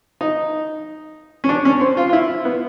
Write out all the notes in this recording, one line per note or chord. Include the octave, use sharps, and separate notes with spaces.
D#4
C#4
D4
C#4
C4
F4
F4
E4
B3